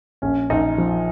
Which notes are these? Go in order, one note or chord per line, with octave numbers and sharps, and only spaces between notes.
A#1 C#4
A#1 D#4
F3